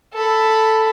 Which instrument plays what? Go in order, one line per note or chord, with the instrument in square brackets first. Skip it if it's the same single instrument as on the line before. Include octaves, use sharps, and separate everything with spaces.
[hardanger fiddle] A4 B5